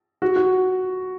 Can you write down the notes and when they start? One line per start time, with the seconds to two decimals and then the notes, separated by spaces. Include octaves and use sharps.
0.22 F#4
0.36 F#4